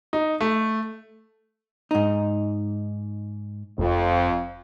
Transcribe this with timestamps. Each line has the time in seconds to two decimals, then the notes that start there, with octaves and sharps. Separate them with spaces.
0.13 D#4
0.41 A3
1.91 G#2 D#4
3.78 F1 F2